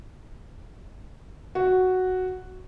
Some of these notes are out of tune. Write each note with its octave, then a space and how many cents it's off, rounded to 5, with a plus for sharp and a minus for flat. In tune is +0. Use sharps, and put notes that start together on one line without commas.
F#4 +0